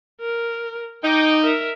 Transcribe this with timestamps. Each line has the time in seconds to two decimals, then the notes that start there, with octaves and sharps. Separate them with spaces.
0.21 A#4
1.04 D#4 G5 D6
1.42 A#4 E5